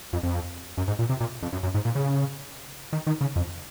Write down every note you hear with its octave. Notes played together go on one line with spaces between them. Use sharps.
F2
F2
F#2
G#2
A#2
C3
A#2
F2
F#2
F#2
G#2
A#2
C#3
D#3
D#3
C#3
F2